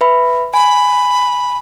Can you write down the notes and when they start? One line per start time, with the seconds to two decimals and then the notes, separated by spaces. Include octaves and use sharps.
0.01 B4 E5 B5
0.54 G#5 B5